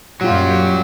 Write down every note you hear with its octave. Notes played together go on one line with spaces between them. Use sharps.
F#2 A#2 F#3 G3 F4 G4